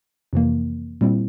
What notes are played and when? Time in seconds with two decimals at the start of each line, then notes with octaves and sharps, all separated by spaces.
0.33 F2 C3 E3 A#3
1.01 A#2 G3 C4 E4